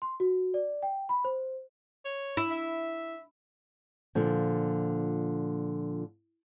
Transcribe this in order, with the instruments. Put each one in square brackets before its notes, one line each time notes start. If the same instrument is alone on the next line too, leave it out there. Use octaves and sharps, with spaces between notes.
[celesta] C6
F#4
D5
G5
B5
C5
[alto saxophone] C#5
[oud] E4
[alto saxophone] E5
[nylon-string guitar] A#2 D3 F3